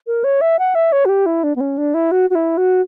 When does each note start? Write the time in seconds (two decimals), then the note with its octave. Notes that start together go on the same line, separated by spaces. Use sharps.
0.07 A#4
0.24 C#5
0.41 E5
0.59 F#5
0.75 E5
0.92 C#5
1.05 F#4
1.09 G4
1.26 E4
1.44 D4
1.56 B3
1.60 C#4
1.78 D4
1.94 E4
2.11 F#4
2.30 F#4
2.35 E4
2.57 F#4